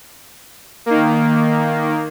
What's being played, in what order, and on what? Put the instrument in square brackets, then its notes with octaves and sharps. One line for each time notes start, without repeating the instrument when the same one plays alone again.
[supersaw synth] D#3 A#3